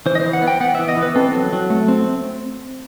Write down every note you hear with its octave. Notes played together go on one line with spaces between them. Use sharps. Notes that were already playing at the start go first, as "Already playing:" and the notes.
E3 C5
D#5
C5
E3
F#5
B3
G5
B3 F#5
E3 E5
D#5
E3
B4
C4 A4
F#3
F#3
A3
C4